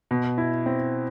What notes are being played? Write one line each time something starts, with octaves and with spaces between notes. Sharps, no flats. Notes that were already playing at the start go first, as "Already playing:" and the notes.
B2
E4
C4